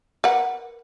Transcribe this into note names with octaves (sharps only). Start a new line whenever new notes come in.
A#4 B4 F#5